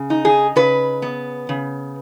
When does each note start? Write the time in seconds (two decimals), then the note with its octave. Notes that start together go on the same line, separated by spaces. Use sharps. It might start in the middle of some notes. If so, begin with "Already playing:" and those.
Already playing: C#3
0.10 D#4
0.25 G#4
0.56 C#3 B4
1.02 B3
1.49 C#3